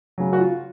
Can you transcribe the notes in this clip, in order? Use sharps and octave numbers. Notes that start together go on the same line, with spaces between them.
C#3 F#3
F#4
F4